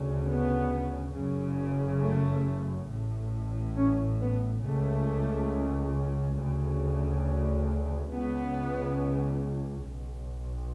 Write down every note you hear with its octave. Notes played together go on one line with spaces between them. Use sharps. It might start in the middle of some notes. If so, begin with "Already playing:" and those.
Already playing: D2 C#3
B3
F#1 F#2 C#3
A3
A1 A2
C#4
B3
C#2 C#3 A3
D2 C#3
C#2 C#3 B3
B1